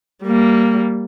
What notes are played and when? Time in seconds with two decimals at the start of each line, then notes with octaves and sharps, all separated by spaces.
0.24 G3 A#3